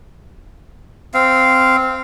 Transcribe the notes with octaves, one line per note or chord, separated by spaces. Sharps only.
C4 F5